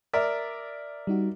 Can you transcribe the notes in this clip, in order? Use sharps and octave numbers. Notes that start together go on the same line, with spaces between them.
A#4 D5 E5
G3 D#4 F#4